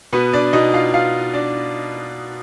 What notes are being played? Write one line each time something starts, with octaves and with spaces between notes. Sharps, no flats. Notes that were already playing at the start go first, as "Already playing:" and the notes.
B2 B3 B4
D4 D5
B2 D#4 D#5
F4 F5
B2 F4 F5
D4 D5